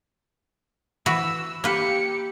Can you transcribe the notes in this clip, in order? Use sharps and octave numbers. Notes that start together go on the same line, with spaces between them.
E3 F#4 B4 E6
A#3 G4 B4 C#7